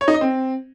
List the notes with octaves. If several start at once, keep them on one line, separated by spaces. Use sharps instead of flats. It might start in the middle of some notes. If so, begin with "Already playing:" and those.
C#5
D#4
D#5
C4